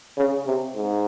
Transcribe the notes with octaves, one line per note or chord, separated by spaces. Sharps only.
C#3
C3
G#2